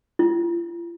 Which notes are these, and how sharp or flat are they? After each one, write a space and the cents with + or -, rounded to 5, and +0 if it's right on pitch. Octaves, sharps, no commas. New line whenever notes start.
F4 -45